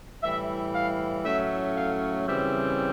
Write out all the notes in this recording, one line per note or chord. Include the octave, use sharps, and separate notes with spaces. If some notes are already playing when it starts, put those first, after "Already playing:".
A2 E3 G3 E5
F5
A2 F#3 A3 C#4 E5
F5
C#3 E3 G3 C4 E5